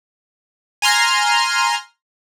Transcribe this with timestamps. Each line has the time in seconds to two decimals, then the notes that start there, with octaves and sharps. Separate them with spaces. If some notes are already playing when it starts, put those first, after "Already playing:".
0.82 G#5 A#5 C6 F6